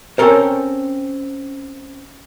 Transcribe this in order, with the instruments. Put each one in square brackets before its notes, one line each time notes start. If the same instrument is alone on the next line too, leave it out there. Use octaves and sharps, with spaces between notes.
[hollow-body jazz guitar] C4 C#4 D#4 A4 A#4 C5